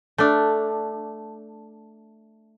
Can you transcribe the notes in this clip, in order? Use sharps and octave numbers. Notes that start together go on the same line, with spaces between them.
A3 D4